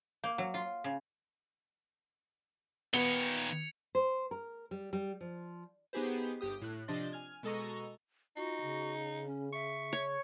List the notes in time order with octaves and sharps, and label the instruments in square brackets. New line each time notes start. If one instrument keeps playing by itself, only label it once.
[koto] A#3
F#3
F4
C#3
[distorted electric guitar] A#2 D#3 [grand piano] B3 G7 [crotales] G#6 C#7 F7
[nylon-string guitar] C5
A#4
G3
G3
F3
[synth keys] B3 D#4 G4 G#4 B4 C5
G1 G4 D#6
A2 F#6
C3 F3 D4 D#5 C6 A6
G#5 F6 G#6
B2 G#3 A4 D#5 A#5 C#6
[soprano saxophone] D#4 [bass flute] F4 [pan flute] F#4
[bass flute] C#3
[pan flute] C#4
[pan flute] E5 [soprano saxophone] C#6
[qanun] C#5